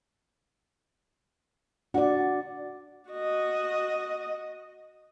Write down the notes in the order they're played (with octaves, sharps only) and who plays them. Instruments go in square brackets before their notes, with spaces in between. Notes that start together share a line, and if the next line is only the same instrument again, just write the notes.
[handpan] D4 D5 [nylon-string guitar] F#4
[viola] F#4 D#5